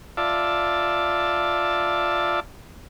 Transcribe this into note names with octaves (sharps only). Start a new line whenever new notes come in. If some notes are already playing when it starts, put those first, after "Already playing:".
F4 D5 E5 A5